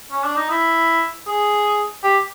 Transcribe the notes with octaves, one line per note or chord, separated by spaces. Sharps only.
C#4
D4
D#4
E4
G#4
G4